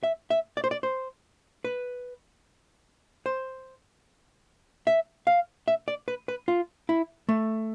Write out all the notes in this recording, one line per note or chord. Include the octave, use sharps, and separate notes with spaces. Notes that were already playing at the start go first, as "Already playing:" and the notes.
E5
E5
D5
C5
D5
C5
B4
C5
E5
F5
E5
D5
B4
B4
F4
E4
A3